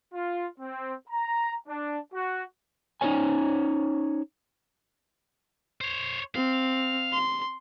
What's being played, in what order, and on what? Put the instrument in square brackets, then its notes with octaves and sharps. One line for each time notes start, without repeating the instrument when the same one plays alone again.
[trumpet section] F4
C4
A#5
D4
F#4
[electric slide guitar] C#4 D#4 E4 C5 C#5 G#5
[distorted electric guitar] C5 C#5
[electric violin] C4 [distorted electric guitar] F5
[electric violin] C6